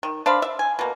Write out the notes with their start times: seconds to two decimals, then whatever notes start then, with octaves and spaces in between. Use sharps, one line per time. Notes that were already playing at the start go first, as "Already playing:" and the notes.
0.03 D#3
0.26 D4 C5 F5 B5
0.42 E5
0.59 G#5
0.79 B2 A#3